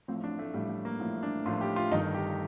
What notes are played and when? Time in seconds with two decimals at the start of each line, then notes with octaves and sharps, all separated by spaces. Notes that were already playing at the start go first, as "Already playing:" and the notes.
0.08 A1 A2 F3 C4
0.24 D4
0.39 A3
0.54 A1 A2 F3 G3
0.69 A3
0.85 A#3
1.00 A1 A2 F3
1.23 D4
1.45 A1 A2 F3 F4
1.61 G4
1.76 F4
1.91 G1 G2 D#3 D#4
2.14 G4